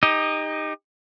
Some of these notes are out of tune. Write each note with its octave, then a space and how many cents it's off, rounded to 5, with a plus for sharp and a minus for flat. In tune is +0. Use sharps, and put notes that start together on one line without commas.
D#4 +0 G4 +30 D#5 +0